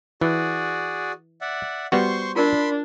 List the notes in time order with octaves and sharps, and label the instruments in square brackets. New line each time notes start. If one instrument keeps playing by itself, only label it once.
[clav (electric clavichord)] E3 [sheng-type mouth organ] F#4 G#4 D5
[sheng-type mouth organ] D5 E5 F#5
[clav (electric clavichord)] G3 B3 F#4 [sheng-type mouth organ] C5 C6 C#6
[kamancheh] D4 [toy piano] F4 A#4 D5 [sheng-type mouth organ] B5 C6